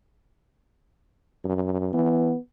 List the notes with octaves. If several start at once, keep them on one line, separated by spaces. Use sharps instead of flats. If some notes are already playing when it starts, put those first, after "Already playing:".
F#2
E3 B3